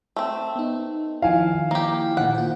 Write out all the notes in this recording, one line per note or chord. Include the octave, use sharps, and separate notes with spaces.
A3 C4
B3 D#4
D#3 F3 E4 F5 G#5
A#3 G4
A#2 D3 D#3 F#5
F4 C5